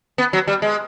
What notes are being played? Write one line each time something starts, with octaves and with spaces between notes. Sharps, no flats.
B3
F#3
G3
G#3